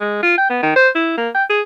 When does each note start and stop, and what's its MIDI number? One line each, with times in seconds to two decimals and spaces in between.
0.01 0.18 56
0.23 0.38 65
0.38 0.48 79
0.50 0.60 59
0.63 0.73 51
0.76 0.89 72
0.95 1.13 64
1.18 1.30 58
1.35 1.44 79
1.50 1.62 68